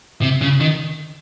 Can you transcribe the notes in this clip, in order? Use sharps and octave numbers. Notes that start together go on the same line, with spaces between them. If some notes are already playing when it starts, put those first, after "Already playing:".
C3
C#3
D#3